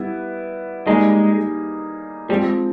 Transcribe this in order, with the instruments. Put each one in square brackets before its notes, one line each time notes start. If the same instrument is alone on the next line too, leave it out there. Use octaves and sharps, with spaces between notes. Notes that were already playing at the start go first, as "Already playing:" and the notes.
Already playing: [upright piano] G3 B3 E4
[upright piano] G3 A#3 D#4 G#4 [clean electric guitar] G#3
[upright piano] F3 G#3 C4 [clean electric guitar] G3